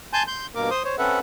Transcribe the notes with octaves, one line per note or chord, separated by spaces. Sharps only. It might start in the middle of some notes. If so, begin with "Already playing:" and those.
G#5 A5 C6 G6
C6 G6
G2 B2 A#3 A#4 D6
C5 C6 D#6
C5 C#5
C4 C#4 A4 B4 E5 F#5